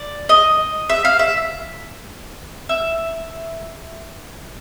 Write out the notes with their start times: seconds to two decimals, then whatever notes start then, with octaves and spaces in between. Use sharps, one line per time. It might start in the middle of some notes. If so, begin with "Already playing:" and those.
Already playing: D5
0.29 D#5
0.89 E5
1.05 F5
1.19 E5
2.69 E5